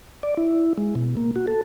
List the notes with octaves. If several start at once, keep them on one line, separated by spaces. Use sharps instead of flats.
D5
E4
G#3
B2
A#3
F#4
A4